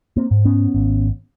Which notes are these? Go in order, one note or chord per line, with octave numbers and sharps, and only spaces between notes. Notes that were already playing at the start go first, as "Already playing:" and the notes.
A#3 C4
G#2
B3 C#4
G#1